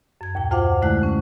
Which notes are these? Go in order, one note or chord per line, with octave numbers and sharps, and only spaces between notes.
F#2 G#6
D#2 A#2 G5
F#2 F4 C5 F5 F#5 D6
D3 G#3 A3 E4 F#6
C#4